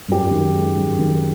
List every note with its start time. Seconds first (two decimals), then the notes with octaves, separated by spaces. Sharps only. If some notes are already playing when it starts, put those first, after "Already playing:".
0.08 F#2 G4
0.31 D#3
0.54 G#3
0.77 F#2
0.99 D#3